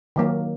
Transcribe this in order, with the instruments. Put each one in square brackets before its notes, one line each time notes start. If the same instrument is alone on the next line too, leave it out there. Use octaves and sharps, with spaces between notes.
[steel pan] D#3 F#3 A#3